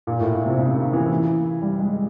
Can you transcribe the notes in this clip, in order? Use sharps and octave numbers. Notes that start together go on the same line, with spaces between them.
A#2
A2
A#2
C3
C#3
D#3
E3
G3
G#3